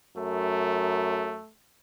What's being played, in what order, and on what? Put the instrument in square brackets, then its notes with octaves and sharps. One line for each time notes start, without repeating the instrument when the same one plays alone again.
[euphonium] F#2 [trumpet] A3